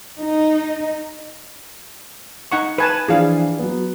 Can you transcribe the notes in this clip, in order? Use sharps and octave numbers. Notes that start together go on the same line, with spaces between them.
D#4
D#4 F#5 C#6
B4 G#5 A5
E3 F3 D4 G#4 F5
F#3 B3